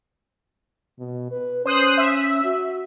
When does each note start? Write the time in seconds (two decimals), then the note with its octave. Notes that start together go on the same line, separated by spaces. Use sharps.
0.99 B2
1.31 B4
1.66 C#4 C5 D#6 F#6
1.97 E5
2.44 F#4